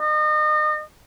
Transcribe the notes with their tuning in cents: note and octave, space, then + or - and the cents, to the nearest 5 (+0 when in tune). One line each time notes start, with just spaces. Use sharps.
D#5 -35